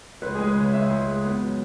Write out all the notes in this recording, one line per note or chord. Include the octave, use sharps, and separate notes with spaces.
C#2 B4
G#4
G#3
B4
C#3 C#5
C#2 E5
C#2
G#3
B3
F#3